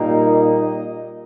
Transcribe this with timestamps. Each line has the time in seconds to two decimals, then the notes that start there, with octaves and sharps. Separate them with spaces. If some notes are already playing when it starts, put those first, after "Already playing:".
Already playing: A#2 G3 A#3 D#4
0.26 D#5